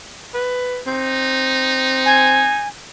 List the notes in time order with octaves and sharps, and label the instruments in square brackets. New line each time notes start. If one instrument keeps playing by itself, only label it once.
[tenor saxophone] B4
[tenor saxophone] C4 [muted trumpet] D#4
[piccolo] G#5